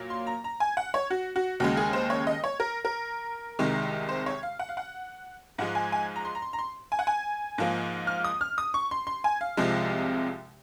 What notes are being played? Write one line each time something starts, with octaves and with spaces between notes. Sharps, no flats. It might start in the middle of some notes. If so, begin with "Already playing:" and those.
Already playing: A#2 F#3 A#3
C6
A#5
A#5
G#5
F#5
C#5
F#4
F#4
D#2 C#3 G#3 F#4
G#4
C5
C#5
D#5
C#5
A#4
A#4
C2 C3 D#3 G#3
C5
C#5
F5
F#5
F5
F#5
G#2 F3 G#3 F#5
G#5
G#5
A#5
C6
A#5
C6
A#5
C6
G#5
F#5
G#5
G#2 F3 A#3
F6
D#6
F6
D#6
C#6
C6
C6
G#5
F5
C2 C3 F3 G#3